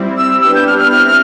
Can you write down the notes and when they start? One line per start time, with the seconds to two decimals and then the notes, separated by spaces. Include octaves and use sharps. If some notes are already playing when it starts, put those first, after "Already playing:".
Already playing: G3 C4 E4
0.17 E6
0.41 B3 D4 G4 B4 E6
0.55 G6
0.67 F6
0.78 F6
0.91 C4 E4 F6
1.07 F6